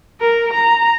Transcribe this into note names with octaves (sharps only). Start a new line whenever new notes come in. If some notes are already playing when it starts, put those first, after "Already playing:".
A#4
A#5